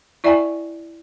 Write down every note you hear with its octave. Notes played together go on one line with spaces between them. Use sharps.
E4 D5 E5 G5 G#5 A#5